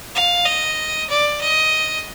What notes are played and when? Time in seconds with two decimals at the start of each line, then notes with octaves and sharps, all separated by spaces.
0.15 F5
0.46 D#5
1.10 D5
1.41 D#5